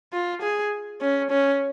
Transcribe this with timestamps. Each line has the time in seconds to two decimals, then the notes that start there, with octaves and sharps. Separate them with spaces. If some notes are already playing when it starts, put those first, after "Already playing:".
0.13 F4
0.42 G#4
1.01 C#4
1.31 C#4